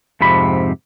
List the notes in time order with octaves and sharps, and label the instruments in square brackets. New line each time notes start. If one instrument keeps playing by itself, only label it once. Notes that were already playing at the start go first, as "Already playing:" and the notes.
[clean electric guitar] F2 G#2 C3 B5